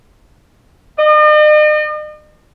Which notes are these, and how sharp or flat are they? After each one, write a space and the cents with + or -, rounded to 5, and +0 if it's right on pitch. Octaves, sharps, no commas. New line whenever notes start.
D#5 -45